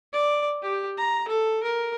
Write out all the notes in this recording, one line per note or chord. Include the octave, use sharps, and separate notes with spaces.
D5
G4
A#5
A4
A#4